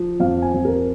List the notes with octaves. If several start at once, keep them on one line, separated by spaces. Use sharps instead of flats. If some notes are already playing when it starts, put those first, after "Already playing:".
Already playing: F3
F2 F5
G#5
F2
A#4